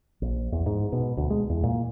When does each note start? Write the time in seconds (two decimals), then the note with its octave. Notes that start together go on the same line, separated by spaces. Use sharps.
0.22 A#1
0.52 E2
0.66 G#2
0.92 B2
1.17 D2
1.30 G#3
1.50 E2
1.63 A#2